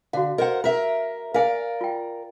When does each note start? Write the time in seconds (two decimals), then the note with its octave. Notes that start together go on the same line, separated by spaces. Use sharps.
0.13 D3 F#4 F5
0.38 A#4 C5 D#5 F#5
0.64 A#4 E5
1.34 A#4 D5 F5 G#5
1.81 F4 G5